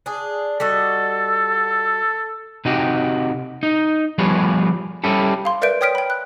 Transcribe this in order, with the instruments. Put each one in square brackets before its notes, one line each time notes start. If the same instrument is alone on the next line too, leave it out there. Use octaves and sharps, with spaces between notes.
[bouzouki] D4 G#4
[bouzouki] G3 F#4 D#5 [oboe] A4
[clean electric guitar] C3 D#4 F#4 G4
D#4
F3 G3 B3 G#4 B4 C#5
G3 C#4 E4 G4 A4
[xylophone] F5 C6
A#4 B4 D5 E5 G6 D7
C#5 G5 D#6 F6 B6 D7
G5 B5
F#6